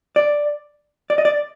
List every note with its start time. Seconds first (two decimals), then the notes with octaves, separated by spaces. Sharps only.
0.16 D5
1.10 D5
1.18 D#5
1.25 D5